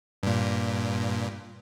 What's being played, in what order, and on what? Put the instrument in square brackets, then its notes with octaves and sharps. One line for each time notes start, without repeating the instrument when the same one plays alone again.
[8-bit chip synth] G2 A#2